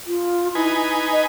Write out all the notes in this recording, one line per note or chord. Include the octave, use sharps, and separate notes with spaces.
F4
D#4 E4 B4 G#5
D#5